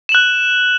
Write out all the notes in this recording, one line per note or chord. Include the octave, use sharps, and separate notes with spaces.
F#6 E7 F#7